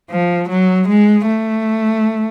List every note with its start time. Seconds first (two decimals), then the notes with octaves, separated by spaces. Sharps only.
0.11 F3
0.49 F#3
0.88 G#3
1.27 A3